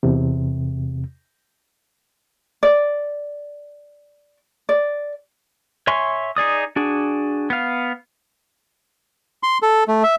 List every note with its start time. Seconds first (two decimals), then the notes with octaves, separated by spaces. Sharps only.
0.03 E2 C3
2.63 D5
4.69 D5
5.87 C#5 E5 G#5 C6 C#6
6.37 D#4 G#4 D5 D#6
6.76 D4 F#4 G#4
7.50 B3 F5
9.43 C6
9.62 A4
9.88 A3
10.03 E5